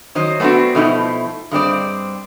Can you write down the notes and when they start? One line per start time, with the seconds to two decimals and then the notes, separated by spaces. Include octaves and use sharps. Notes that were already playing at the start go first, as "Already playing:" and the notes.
0.15 D#3 F#3 C5 D#5
0.40 A3 B3 C4 D4 F#4
0.75 B2 F3 A3 C4 D#4 E4
1.51 G2 G#3 C4 D5